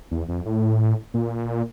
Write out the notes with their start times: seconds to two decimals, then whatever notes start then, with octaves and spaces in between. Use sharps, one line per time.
0.11 E2
0.29 F2
0.46 A2
1.14 A#2